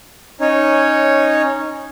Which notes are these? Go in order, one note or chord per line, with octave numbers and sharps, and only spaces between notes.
C#4 D#4 C#5